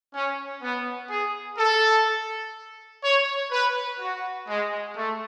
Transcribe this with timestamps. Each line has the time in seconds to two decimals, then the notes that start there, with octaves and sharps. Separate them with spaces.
0.14 C#4
0.63 B3
1.10 G#4
1.59 A4
3.04 C#5
3.51 B4
4.00 F#4
4.48 G#3
4.97 A3